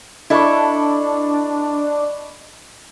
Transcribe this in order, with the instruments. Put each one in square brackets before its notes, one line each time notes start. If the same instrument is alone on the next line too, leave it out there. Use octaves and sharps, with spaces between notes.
[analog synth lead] D4 [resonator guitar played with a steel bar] E4 A4 [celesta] D#5 B5 C#6